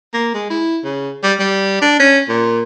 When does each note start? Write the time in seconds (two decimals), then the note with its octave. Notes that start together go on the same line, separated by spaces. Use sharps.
0.14 A#3
0.34 G#3
0.50 E4
0.84 C#3
1.24 G3
1.40 G3
1.82 D4
1.99 C#4
2.29 A#2